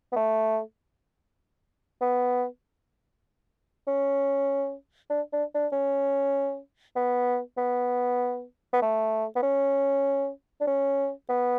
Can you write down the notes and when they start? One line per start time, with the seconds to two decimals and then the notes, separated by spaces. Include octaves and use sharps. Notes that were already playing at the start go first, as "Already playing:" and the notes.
0.12 B3
0.16 A3
2.01 B3
3.87 C#4
5.10 D4
5.33 D4
5.55 D4
5.72 C#4
6.96 B3
7.57 B3
8.73 B3
8.82 A3
9.36 B3
9.43 C#4
10.61 D4
10.67 C#4
11.29 B3